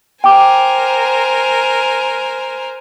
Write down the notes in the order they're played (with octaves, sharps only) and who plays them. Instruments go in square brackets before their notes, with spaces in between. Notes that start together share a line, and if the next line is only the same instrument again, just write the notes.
[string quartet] A#4 C5 G#5 [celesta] G5 D6